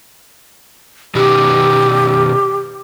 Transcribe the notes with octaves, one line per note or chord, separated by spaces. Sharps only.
B2 D#3 F#4 G4